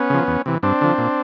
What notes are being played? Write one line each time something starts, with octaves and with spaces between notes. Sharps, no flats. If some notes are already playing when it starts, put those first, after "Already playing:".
Already playing: B3 C#4
C#3 F3
E2
C3 E3
G2 C4 D4
D3 F3
A#2